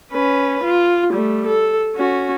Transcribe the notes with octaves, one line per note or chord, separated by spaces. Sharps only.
C#4 B4
F4
G3 A3
A4
C#4 F#4